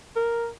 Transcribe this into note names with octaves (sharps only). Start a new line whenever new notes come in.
A#4